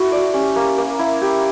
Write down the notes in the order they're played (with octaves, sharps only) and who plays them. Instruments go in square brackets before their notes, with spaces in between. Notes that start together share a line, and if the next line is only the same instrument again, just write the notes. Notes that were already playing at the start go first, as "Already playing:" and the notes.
Already playing: [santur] E4 A4 [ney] F#4
[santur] D5
[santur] C#4 [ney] G4
[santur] A#3
A#3
E4
G4